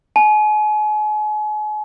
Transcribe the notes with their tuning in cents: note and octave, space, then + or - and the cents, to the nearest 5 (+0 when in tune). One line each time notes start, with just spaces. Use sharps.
G#5 +40